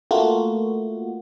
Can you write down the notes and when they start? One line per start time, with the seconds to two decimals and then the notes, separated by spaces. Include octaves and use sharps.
0.11 A3 A#3 F4 F#4